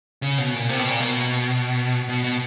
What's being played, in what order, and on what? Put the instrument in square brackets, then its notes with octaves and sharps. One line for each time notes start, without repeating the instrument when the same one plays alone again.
[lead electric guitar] C#3
B2
A#2
C3
B2
A#2
B2
B2
B2